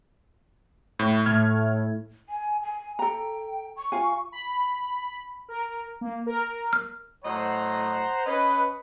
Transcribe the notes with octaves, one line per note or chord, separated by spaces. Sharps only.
A2
A2 A3 F6 G#6
G#5
G#5
A4 G5 A#5
C#6
F4 F5 G#5
B5
A#4
A#3
A#4
F6
A2 F#3 C5 D#5 F#5 A#5
C#4 B4 D#5